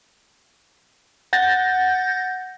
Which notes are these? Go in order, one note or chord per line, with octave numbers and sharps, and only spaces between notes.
F#5 G6 A6 A#6